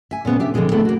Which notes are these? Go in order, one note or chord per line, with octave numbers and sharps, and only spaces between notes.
E5 G#5
A#2 C#3 B3 C5
D4 G4 E5
B2 D3 F3 F#3 G#3 C4
D3 A3 B3 C4 E4
A#3 F#4